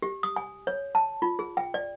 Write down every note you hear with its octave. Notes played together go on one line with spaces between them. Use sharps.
G4
D#6
G#5
C#5
A5
F4
G#4
G5
D5